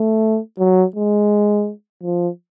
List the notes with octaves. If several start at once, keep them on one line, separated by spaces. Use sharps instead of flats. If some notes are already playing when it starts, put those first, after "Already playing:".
Already playing: A3
F#3
G#3
F3